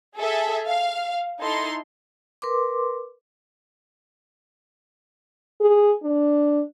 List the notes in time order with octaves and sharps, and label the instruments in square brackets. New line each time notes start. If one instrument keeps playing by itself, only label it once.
[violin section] G#4 A4 E5
F5
D#4 E4 A4 C6
[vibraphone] A#4 B4 C6 D6
[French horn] G#4
D4